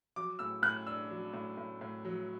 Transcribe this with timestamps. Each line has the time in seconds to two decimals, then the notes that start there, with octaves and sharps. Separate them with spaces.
0.16 F#3 D6
0.39 A2 E6
0.63 A2 F#6
0.87 D4 E6
1.10 F#3
1.33 A2
1.57 A2
1.81 A2
2.05 F#3